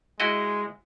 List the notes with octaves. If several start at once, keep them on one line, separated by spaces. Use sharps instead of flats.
G#3 E4 F#4 D#5